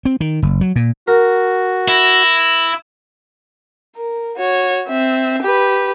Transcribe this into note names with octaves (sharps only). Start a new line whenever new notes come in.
C4
D#3
F#1
F#3
A#2
F#4 A#4
E4 A#6
A#4
F#4 C#5
C4 E5
G4 B4